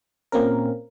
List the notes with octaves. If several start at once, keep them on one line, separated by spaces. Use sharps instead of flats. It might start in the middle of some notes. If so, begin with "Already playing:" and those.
A#2 A#3 C4 C#4 A#4